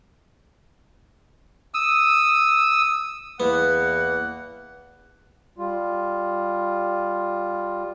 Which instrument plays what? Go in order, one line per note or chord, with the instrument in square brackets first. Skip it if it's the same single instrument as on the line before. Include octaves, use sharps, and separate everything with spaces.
[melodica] D#6 E6
[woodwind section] E2 A#3 F#5 [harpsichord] B3
[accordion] G3 F4